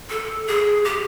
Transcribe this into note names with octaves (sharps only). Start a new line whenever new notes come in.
A4
G#4
G4